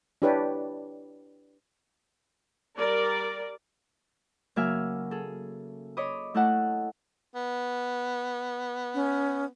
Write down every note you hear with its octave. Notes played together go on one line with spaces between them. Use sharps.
D4 E4 G4 B4 C#5 D5
G3 A#4 D5
C#3 F#3 A#3 E5 G#5 F6
G#4 A4
C#5 D#5 B5 D6 D#6
A3 E4 A4 D#5 F#5 A5
B3
C#4